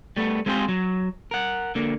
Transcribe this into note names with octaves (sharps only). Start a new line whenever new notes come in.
G3 A3 B3
G#3 C4 F4 G4 G#4 C5
F#3
A#4 F#5
D3 A#3